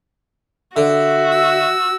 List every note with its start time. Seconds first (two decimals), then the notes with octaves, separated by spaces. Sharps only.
0.77 D3 F#4 E5
1.31 E6